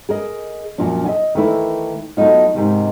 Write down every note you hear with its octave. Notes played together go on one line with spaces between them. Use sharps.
G#4 A#4 D#5
F#2 A#2 F3 D4
D#5 E5 G#5
D#3 E3 A3 E4
F#3 A3 B3 D#4 F4
G#2 C3 D#3